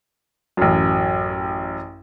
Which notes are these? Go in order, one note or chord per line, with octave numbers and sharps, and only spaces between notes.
A1 F#2